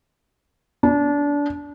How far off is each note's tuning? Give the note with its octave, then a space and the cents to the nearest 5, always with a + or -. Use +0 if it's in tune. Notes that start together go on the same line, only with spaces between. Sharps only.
D4 -25